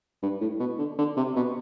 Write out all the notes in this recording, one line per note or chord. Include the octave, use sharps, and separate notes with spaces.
G2
A2
B2
D3
D3
C3
B2